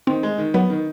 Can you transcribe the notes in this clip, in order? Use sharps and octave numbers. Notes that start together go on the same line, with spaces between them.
D#3 C4
G#3
D#3
F#3 B3
D#3